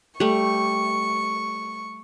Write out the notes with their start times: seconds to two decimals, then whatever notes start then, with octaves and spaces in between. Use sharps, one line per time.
0.20 G3 A3 C#6